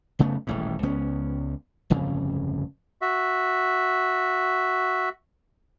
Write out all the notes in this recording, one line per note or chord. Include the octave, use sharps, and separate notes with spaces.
F#1 C#3 A3 B3
D#1 A1 G#2
C#2 B3 C#4
D1 G1 F2 C#3
F#4 E5